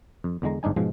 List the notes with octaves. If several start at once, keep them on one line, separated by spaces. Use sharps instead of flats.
F2
E2 D3 G#3 A#5
G1 G#2 D4 D#4 G#5
G#2 B2 F3 G#3